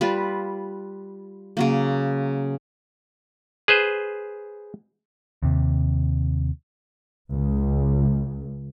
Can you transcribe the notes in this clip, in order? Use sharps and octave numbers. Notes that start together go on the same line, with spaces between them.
G3 F4 B4
C#3 F#3 A#3
G#4 B4 C5
D#2 C3
C#2